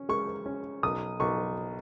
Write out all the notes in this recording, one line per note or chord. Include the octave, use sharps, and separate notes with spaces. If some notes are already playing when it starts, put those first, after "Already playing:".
Already playing: C#4
G#3 C#6
C#4
B1 D#6
B1 C#6